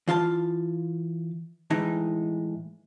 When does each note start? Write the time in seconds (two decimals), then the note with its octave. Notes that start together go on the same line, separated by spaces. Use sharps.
0.08 E3 F4 F5 A5
1.70 A2 E3 G#3 D#4